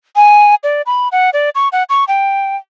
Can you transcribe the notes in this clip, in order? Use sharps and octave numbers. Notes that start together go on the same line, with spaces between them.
G#5
D5
B5
F#5
D5
C#6
F#5
C#6
G5